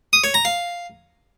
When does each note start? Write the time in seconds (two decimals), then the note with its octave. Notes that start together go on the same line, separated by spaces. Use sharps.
0.13 D#6
0.24 C#5
0.34 A#5
0.45 F5